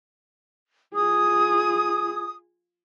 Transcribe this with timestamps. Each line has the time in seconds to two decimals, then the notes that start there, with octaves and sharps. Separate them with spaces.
0.95 F4 G#4 D#6